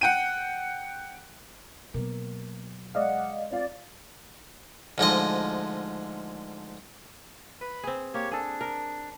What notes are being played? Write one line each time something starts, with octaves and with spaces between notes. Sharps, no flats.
F#5 G5 D#7
B2 F#3 A#3
G#3 D5 D#5 F5 F#5
C4 F4 D5 F5
D2 G#2 F3 D#5
B4 B5
C4 G#4
A#3 G4 C#5
D4 G#4 A4
A#4